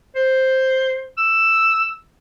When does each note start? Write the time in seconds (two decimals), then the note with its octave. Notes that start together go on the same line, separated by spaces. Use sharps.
0.16 C5
1.18 E6